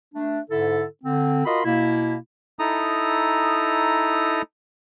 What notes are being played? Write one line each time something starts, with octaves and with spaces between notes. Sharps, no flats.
A3 D4
G#2 D3 E4 A4
D3 C4
F4 F#4 A#4 D#5 B5 C6
B2 A#3 E4
D#4 E4 A4 A#5 D#6